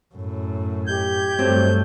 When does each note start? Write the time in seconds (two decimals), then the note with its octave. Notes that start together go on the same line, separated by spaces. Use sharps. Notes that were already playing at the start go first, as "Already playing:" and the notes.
0.14 F#2 A2
0.87 G4 D#5 G6 G#6
1.39 G2 F#3 A3 C4